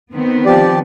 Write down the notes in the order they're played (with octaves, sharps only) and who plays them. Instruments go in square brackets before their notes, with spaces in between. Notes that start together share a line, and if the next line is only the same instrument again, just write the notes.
[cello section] D#3 B3 C4
[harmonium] F3 G4 D5